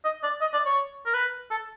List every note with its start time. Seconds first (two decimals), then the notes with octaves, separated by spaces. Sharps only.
0.05 D#5
0.23 D5
0.41 D#5
0.54 D5
0.66 C#5
1.06 A#4
1.14 B4
1.51 A4